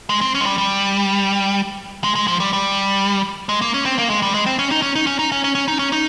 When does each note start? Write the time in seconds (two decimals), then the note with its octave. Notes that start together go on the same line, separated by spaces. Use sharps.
0.10 G#3
0.21 C4
0.35 C#4
0.41 G#3
0.46 G3
0.58 G3
2.04 G#3
2.15 G#3
2.28 F3
2.40 G3
2.53 G3
3.49 G#3
3.62 A#3
3.74 C#4
3.86 C4
3.99 A#3
4.10 G#3
4.22 G3
4.34 G#3
4.46 C4
4.59 C#4
4.71 D#4
4.82 C#4
4.96 D#4
5.07 C#4
5.19 D#4
5.32 C#4
5.44 C#4
5.55 C#4
5.68 D#4
5.79 C#4
5.93 D#4